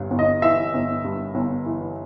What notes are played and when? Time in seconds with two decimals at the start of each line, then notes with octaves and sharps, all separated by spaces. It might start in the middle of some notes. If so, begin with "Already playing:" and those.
Already playing: G1 G2
0.11 G1
0.19 D#5
0.42 E3 E5
0.74 G1
1.04 G2
1.35 G1
1.66 E3